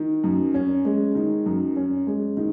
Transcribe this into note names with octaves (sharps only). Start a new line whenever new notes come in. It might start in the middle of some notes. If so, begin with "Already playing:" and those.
Already playing: D#3
F#2
C#4
G#3
D#3
F#2
C#4
G#3
D#3